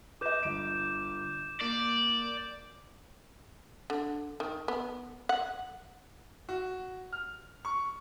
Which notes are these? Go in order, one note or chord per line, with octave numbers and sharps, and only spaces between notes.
B4 D#5 D6 G6 E7
G1 D7
A#3 D5
D3
D#3
B3
F#5
F#4
F6
C#6